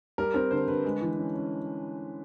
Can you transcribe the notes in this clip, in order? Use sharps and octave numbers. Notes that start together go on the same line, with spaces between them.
G3 A#4
C4 A#4
D3 C5
D3 B4
G#3
E3
C#4
C#4